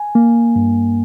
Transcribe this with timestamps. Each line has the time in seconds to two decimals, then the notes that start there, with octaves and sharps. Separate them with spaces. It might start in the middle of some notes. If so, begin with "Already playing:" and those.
Already playing: G#5
0.15 A#3
0.56 G2